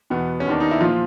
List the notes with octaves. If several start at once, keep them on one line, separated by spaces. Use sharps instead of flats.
E2 B2 B3
C#4
D#2 D#3 D4
D#4
E4
A#2 F3 F4